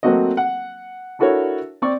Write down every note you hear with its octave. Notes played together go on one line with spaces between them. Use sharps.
F#3 A3 A#3 C4 F#4 D#5
F#5
D4 E4 F#4 A4 A#4 C#5
C4 D5 C#6